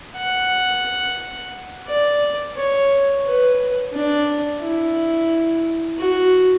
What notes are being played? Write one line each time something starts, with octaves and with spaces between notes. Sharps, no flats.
F#5
D5
C#5
B4
D4
E4
F#4